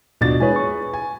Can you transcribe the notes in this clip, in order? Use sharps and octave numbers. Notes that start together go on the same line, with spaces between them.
D#2 B2 B3 D4 F4 A6
G#3 E4 G#4 B4 C#5 G#5
C#6
G#5